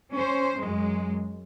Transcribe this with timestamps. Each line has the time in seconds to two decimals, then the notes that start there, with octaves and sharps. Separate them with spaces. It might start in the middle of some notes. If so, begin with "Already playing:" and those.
0.14 C#4 C5
0.59 F#2 G#3